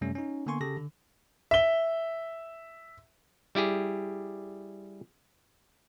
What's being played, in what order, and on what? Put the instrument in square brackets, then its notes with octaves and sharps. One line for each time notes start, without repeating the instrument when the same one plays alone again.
[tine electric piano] F#2 C3 G3 A3 C#4
C#4 D#4
D3 A#3 B3 G#5 C6 C#6
C#3 G4 A4 A5 A#6
D3
[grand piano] E5 G7
[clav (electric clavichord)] G3 E4 G4 G#4